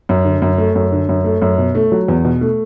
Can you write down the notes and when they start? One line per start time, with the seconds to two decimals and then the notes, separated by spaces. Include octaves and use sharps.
0.09 F#2
0.25 D3
0.42 F#2
0.58 A3
0.75 F#2
0.92 D3
1.09 F#2
1.24 A3
1.42 F#2
1.58 B2
1.75 A3
1.92 F#3
2.08 E2
2.25 B2
2.41 A3